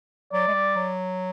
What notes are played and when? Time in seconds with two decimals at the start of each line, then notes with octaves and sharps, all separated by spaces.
0.33 F#3 D5
0.48 G#3
0.54 G3
0.76 F#3